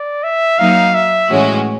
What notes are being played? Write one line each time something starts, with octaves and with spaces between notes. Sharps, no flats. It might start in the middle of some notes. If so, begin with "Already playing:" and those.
Already playing: D5
E5
F#3 A#3 D#4 F5
E5
A2 E3 G#3 C#4 F#4